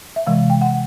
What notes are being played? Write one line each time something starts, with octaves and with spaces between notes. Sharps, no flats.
E5
C3 E3 G#3 F5
G5
F#5